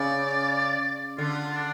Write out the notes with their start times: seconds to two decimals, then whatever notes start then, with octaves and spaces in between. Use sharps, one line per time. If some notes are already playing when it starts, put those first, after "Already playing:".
Already playing: C#3 D5
1.18 D3 F4
1.54 D4